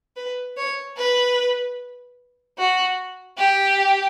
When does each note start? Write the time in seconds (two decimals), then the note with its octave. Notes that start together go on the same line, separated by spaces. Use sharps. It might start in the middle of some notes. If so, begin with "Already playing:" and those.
0.16 B4
0.57 C#5
0.97 B4
2.58 F#4
3.38 G4